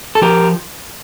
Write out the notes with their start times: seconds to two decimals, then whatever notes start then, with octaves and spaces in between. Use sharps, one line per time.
0.15 A4
0.22 F3 G4 A#4